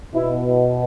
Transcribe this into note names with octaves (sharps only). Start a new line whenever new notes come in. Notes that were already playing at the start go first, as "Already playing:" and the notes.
B2 E4